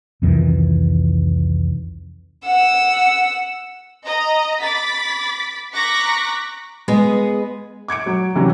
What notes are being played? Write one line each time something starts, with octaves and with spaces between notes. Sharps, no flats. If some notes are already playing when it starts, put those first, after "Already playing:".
C2 F2 D#3 E3
F#5 E6
D#5 A#5
B5 D6 A6 B6
A#5 C#6 D6 F#6 A#6 B6
G#3 B3 G#4 D#5
D6 G#6 C#7 D7
F#3
C3 E3 F#3 C#4 D4